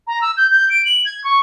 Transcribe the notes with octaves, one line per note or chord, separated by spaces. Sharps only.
A#5
E6
G6
G6
D7
F#7
G#6
C#6